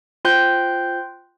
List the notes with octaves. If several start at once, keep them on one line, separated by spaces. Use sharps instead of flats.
F4 C5 G5 C6 F#6 G6